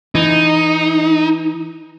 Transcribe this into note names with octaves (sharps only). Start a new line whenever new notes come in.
E3 D#4